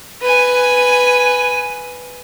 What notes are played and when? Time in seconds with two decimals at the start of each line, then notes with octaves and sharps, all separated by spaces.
0.21 B4 G#5